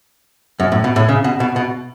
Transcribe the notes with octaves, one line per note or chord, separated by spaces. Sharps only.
F#2
A2
B2
A2
C#3
B2
B2
B2